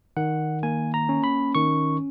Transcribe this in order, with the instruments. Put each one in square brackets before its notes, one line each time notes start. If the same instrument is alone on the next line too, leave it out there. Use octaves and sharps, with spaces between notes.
[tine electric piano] D#3 F#5
A#3 G#5
A#5
C#4
B5
D#3 C#6